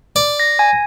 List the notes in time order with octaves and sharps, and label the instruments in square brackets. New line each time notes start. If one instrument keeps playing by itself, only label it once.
[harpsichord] D5
[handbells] A#6
G#5